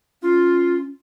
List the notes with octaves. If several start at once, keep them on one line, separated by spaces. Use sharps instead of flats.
C#4 F4